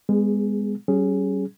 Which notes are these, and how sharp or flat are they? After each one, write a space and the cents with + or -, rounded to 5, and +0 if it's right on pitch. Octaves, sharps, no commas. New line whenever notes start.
G#3 -30 B3 +15 G#4 +5
G3 -40 C#4 +0 G#4 +0